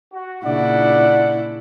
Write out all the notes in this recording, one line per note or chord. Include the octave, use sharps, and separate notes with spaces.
F#4
A#2 C#3 D4 E4 D5 F#5